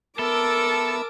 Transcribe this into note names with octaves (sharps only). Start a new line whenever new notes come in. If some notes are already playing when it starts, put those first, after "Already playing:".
B3 A4 A#4 E5 A5 D6 E6